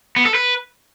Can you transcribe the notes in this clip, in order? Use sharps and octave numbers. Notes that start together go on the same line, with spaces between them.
B3
A4
B4